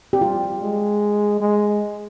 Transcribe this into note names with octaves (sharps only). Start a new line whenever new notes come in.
G4
G3 F4
G#3
G#3